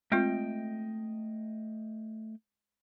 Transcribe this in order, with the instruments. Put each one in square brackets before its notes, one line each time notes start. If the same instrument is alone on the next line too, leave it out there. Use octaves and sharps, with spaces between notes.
[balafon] G#3 C4 F4 [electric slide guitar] A3 D#5 G5